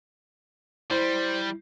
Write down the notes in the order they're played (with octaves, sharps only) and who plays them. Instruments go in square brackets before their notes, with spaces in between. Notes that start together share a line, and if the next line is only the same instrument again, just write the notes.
[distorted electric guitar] G3 [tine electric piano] E4 [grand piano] C5